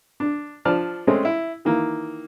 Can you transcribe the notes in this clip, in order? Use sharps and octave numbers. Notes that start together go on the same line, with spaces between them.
D4
F3 D4 D5 A5 F6
G#3 A3 C4 C#4 D#5
E4
D#3 E3 A#3